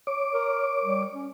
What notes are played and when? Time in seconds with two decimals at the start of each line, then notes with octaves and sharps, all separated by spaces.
0.07 C#5 D6
0.34 A#4
0.84 G3
1.13 C#4